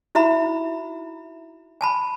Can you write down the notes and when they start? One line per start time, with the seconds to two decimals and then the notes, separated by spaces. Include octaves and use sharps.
0.15 D#4 E4 F#4 E5 A#5 B5
1.81 G#5 A5 B5